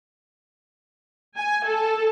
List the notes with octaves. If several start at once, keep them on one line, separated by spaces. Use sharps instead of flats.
G#5
A4